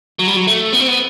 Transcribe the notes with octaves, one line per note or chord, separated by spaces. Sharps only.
F#3
G3
F#3
A3
B3
C4
B3